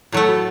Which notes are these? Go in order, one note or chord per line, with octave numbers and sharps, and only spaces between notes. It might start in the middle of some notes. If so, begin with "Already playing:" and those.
A2 F#3 A3 E4
F#4